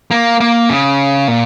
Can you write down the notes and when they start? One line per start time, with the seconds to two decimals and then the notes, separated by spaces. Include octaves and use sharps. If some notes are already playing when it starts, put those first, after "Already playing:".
0.11 A#3
0.40 A#3
0.69 C#3
1.28 A#2